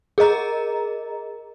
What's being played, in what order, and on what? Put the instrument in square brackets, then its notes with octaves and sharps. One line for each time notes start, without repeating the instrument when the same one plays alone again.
[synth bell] G#4 A#4 D#5 A#5